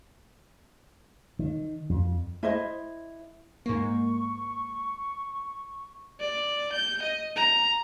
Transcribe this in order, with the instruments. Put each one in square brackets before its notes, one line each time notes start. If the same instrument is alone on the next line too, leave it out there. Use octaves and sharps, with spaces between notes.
[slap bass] D#3
F2
[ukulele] E4 C5 D#5
[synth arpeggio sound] G#2 A#3 [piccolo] C#6
[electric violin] D5
G6
D#5
A#5